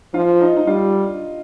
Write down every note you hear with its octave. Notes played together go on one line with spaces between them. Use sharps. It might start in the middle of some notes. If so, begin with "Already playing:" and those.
F3 F4
D#4
D#4
G3 F4